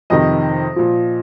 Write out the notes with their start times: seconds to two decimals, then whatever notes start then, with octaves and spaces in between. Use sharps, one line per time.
0.10 F2 C3 D#3 D#5
0.76 A#2 F3